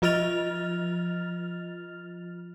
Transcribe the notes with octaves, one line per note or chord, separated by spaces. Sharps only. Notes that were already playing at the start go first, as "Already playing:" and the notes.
F3 F4 D#5 F6 A6 F7